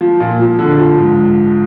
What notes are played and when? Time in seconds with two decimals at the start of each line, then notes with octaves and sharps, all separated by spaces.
0.01 F3
0.20 A#2
0.39 F3
0.59 D3
0.78 F3
0.97 G#2